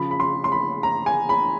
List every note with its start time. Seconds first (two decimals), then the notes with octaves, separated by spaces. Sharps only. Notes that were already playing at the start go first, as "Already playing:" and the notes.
Already playing: C#3 F3 B5
0.11 B5
0.20 C6
0.44 C6
0.52 B5
0.83 A#5
1.06 G#5
1.29 B5